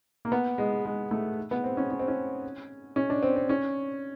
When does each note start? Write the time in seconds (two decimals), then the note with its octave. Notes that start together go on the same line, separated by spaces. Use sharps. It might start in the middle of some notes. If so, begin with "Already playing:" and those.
0.25 A#3
0.32 B3
0.58 G#3
0.85 G#3
1.11 A3
1.51 B3
1.64 C4
1.77 C#4
1.90 C#4
1.99 C4
2.08 C#4
2.96 C#4
3.10 D4
3.23 C4
3.36 C4
3.49 C#4